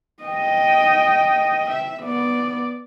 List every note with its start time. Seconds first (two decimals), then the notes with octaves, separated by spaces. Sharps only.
0.23 D#5 G5
1.70 E5
2.03 B3 D5